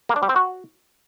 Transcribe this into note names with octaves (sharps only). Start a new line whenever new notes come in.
A#3
D4
G3
C4
F#4